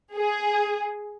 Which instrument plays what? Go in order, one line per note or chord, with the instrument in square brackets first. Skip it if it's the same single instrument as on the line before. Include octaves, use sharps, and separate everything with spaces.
[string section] G#4